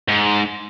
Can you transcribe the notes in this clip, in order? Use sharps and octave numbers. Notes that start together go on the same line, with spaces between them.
G#2